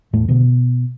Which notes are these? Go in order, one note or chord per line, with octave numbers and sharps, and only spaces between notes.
E2 A2 A3
B2 D3 B3